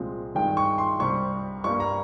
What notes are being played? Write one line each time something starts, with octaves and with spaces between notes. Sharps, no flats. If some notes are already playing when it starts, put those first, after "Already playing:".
Already playing: C2 A#2 F3 G#3 C4
G2 D#3 G#3 G5
C#6
C6
C2 C3 G3 C4 C#6
G2 G3 A#3 C#6
A#5